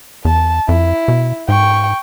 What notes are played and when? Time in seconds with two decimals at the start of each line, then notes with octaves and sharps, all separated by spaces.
0.25 E2 A5
0.69 F2 E4
1.08 B2
1.49 G#2 G5 C#6